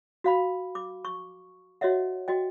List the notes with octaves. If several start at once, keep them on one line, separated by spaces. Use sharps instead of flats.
F#4 F5 B5
D6
C#6
F#4 C#5 D#5 E5 F#5
F#4 D#5 G5